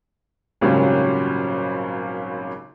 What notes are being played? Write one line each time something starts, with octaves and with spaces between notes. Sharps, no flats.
G#1 A#2 C#3 F#3 G3